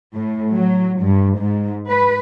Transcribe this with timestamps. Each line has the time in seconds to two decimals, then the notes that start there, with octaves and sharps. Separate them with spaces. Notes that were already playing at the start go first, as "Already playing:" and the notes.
0.14 A2
0.56 F#3
1.00 G2
1.38 G#2
1.87 B4